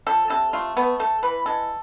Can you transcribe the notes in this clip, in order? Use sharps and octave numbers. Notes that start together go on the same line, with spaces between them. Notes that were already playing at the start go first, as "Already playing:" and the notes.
F3 A4
C3 A4
A3 F4
A3 B3
A3 A4
E3 B4
G#3 A4